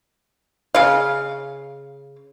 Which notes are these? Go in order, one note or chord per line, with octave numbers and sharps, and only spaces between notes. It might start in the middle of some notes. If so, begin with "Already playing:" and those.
C#3 F5